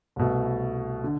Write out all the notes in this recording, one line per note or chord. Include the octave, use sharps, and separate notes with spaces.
C2 B2 A3
D3